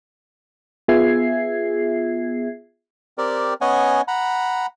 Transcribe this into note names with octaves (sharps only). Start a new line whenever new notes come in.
B3 F4 G#4 E5 G#6 C7
C4 G4 A#4 D5
B3 C#4 C#5 D#5 F#5 G#5
F#5 A#5 B5